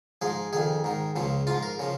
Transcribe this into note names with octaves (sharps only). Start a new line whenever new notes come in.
G#2 F3 G#4
F2 D#3 G#4
G#2 D#3
C#2 C#3 F3
G#2 F3 F4
A#4
C#3 F3